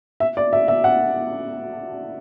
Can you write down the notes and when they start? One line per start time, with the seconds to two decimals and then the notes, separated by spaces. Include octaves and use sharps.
0.20 E5
0.37 D5
0.53 E5
0.68 E5
0.84 F#5